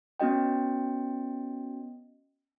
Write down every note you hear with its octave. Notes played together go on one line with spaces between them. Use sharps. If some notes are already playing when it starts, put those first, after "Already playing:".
B3 C#4 F#4 D#5 G5